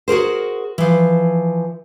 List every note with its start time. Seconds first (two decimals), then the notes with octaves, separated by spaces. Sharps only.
0.08 F#4 G#4 A#4 C5
0.78 E3 F3